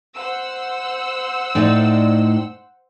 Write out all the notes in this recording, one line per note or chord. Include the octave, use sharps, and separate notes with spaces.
C5 F#5 E6
A2 D#4 D5